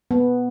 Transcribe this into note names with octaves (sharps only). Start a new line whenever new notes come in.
B3